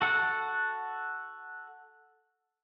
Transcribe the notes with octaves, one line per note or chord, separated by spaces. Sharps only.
F#4 A4 F#5